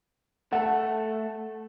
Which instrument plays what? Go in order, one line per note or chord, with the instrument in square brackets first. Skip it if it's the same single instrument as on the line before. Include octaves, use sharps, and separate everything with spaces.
[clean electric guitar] A3 A4 [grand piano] F#5